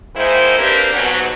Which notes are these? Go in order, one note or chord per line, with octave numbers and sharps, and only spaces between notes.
D#3 G#3 A#3 E4 C5
A#3 C4 D4 G4 A#4 B4
G#2 B2 F#3